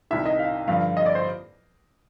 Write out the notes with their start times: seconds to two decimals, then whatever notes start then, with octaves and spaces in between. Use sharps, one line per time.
0.11 C2 C3 D#3 E5
0.25 D#5
0.39 F5
0.68 G2 D3 F3 F5
0.97 D#5
1.06 D5
1.15 C5